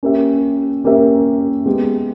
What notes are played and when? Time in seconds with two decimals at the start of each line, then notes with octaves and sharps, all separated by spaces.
0.03 A#3 C#4 G4 A#4 E5
0.84 A#3 C#4 G4 A#4 E5
1.66 G#3 B3 G4